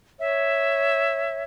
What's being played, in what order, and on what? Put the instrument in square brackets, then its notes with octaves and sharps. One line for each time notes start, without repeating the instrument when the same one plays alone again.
[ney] C#5 [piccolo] E5